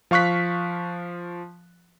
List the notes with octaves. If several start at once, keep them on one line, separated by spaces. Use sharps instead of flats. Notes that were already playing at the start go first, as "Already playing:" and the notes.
F3 F5 C#6 F#6 B6